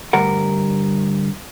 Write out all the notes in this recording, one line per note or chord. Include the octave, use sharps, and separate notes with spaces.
D2 G2 G3 A#4 F#5